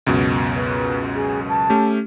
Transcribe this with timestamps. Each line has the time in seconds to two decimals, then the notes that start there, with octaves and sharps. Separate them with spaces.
0.07 C#2 F#2 B2
0.55 B4
1.15 G#4
1.49 A5
1.70 A3 C#4 G4